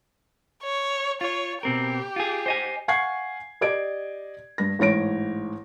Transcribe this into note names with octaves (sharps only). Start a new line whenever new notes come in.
C#5
F4 C#5
B2 C4 G4 A#4
F4 G#4
C5 D#5 G#5
F5 F#5 G#5 C#6 G#6 C7
G4 D5 D#5 G#6 D7
G2 A#6
A1 G#2 C#5 A#6 D7